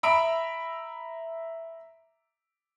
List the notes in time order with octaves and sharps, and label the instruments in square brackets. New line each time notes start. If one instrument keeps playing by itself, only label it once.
[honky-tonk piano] E5 A#5 B5 E6 D7